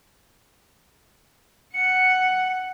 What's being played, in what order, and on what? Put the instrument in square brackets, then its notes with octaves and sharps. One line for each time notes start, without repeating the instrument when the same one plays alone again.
[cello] F#5 [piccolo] C#7